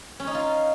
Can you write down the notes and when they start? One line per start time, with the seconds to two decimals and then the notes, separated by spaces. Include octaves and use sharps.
0.20 C#4
0.27 D#4
0.35 F4